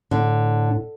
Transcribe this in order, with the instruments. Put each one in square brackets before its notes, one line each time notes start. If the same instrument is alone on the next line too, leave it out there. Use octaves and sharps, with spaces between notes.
[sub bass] A2 [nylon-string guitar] D3